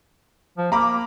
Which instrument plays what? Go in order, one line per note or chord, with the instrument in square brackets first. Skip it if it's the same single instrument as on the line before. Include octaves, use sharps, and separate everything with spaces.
[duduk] F3
[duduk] A#3 [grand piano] A#5 B5 D6